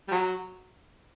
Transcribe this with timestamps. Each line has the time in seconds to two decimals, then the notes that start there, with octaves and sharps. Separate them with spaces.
0.08 G3
0.11 F#3